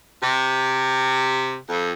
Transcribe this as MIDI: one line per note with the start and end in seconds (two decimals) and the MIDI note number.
0.23 1.54 48
1.69 1.91 41